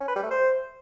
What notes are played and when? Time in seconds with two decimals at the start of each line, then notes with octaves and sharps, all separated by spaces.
0.01 C#4
0.08 B4
0.16 G3
0.23 A3
0.31 C5